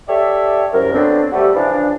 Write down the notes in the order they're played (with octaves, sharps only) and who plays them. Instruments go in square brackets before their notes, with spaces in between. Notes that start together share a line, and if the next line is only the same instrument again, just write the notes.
[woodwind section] G4 A4 C#5 D5 E5
C2 F#2 A#4
D3 F3 F#3 B3 C4 D4
C3 G3 A3 F#4 G4 A4
C#3 E3 F3 D4